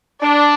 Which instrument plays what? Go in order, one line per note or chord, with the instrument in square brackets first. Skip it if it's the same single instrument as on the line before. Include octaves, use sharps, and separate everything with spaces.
[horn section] D4 [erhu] D5